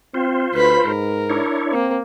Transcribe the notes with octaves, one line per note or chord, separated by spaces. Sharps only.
C4 F4 C5
D2 B4 B5
G#2 A#4
D4 E4 C#5
A#3 C4